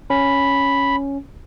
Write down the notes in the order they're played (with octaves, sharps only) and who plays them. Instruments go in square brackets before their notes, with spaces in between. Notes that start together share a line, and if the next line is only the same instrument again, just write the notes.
[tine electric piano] C#4 [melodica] B5